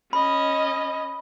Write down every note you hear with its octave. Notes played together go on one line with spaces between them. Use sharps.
C#4 D#5 B5